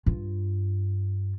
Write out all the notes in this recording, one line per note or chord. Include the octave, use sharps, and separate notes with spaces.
G2 F4